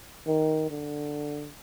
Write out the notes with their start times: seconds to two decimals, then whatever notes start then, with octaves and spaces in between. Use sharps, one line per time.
0.27 D#3
0.70 D3